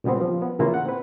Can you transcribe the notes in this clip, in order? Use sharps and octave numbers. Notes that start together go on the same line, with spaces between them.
A#2 C#3 G3 B3 C4
F3
B3
A2 C#3 E3 A#3 E4 F4
F#5
C4 B4